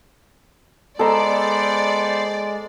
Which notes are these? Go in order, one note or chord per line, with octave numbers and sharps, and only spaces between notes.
G#3 B3 A4 C5 D5 D#5 A#5